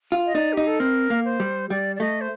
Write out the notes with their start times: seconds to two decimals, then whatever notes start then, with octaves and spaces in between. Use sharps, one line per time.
0.12 F4
0.26 D#5
0.35 D#4 D5
0.53 D#4 G4
0.67 A4
0.79 C4 A#4
1.10 A#3
1.25 C5
1.40 G3
1.70 G3 D5
1.96 D5
2.00 A3 D#5
2.21 C5